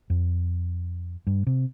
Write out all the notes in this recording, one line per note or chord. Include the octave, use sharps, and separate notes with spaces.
F2
G2
C3